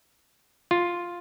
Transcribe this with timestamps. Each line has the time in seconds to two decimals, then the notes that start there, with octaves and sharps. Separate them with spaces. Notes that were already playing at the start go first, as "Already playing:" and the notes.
0.71 F4